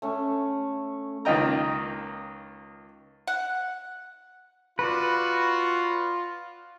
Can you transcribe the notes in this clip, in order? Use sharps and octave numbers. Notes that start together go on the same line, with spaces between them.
A3 C#4
C#2 D#3 A#3 D#5 G5 A#5
F#5
F4 F#4 B4 D5